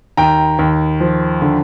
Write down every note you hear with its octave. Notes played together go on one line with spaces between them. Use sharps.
D#2 G5 A#5
D#2
F3
D3